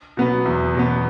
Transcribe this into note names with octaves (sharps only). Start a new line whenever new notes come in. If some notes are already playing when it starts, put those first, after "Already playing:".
B2 F#3 B3
E2
B2 F#3 B3